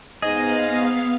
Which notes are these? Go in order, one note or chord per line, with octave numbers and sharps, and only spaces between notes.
G#2 B3 G#4 D#5 F5